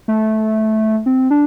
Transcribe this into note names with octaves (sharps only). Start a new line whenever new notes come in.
A3
C4
D4